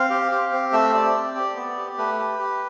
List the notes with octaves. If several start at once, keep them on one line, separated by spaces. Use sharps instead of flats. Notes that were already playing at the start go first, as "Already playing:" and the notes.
Already playing: C4 F5
G4
G4
C4
A3 E5
G4 D5
C4
G4
B3
G4
A3 B4
G4
G4